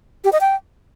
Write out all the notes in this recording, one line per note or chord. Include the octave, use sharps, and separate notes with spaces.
G4
D#5
G5